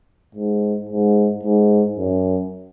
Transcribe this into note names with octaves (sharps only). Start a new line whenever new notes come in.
G#2
G#2
G#2
F#2